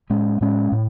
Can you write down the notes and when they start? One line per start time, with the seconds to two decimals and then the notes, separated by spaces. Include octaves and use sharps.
0.10 A2 G#3 C#4
0.41 A2 G#3 C#4
0.72 A2